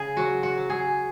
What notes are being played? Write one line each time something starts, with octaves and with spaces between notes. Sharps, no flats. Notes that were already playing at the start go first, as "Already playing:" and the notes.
Already playing: C#3 G#4
F#3 F#4
F#4
F#3
G#4